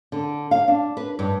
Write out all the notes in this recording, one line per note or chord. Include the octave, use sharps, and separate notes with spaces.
D3
F5
D4
B4
G2